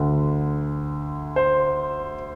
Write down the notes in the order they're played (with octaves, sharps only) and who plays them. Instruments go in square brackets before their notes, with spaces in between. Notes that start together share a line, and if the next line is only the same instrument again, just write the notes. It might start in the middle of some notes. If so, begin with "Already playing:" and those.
Already playing: [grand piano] D2 D3
C5